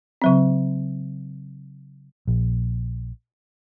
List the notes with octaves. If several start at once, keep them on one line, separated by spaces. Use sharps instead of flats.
C#3 F#3 C4
A#1